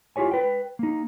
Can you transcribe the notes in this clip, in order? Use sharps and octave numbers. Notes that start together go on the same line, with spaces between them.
E4 F4 G4 C#5 G#5
B4 G5
A#3 D#4